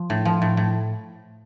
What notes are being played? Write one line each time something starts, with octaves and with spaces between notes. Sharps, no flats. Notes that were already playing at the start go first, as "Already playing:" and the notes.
Already playing: F3
A2
F3
A2
A2